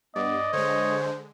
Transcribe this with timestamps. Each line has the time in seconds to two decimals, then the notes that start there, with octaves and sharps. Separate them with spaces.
0.16 G2 B3 D5 D#5
0.53 D3 G#3 C5 C#5